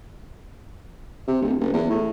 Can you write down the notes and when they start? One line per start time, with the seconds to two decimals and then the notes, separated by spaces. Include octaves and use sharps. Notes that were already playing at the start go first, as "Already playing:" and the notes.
1.28 C3
1.42 D1
1.60 F#1
1.73 E2
1.90 A2